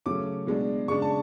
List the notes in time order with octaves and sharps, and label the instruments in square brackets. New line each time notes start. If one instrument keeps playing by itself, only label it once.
[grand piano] C#3 F#3 A3 C#4 D6
B2 G#3 D4
C#3 G#3 D4 C#6
A5